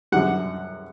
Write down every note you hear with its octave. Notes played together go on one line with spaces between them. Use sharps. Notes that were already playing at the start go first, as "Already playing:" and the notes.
F#2 D3 G3 F#5